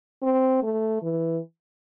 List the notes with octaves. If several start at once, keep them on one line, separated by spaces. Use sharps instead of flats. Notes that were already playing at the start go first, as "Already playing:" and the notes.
C4
A3
E3